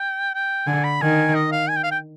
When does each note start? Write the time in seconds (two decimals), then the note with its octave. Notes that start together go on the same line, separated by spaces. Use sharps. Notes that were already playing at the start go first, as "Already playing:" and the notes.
Already playing: G5
0.34 G5
0.67 D3 G#5
0.84 B5
1.02 D#3 G#5
1.35 D#5
1.52 F5
1.69 G#5
1.76 G5
1.83 F5
1.91 G5